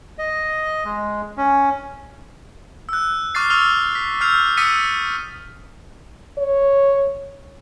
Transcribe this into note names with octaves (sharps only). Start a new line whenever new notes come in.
D#5
G#3
C#4
E6 F#6
C#6 D6 F6 F#6 A6 C7
C#6 E6 F6 F7 G7
B6
E6 F6 G6 C7 F7
D#6 E6 A6 B6 C#7 D#7
C#5